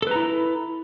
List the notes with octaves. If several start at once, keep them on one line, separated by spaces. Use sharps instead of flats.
E4 A4 B4 A#5